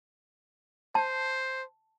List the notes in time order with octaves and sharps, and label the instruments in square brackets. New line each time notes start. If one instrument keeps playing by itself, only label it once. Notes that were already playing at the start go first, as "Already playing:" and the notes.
[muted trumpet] C5 [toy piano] A5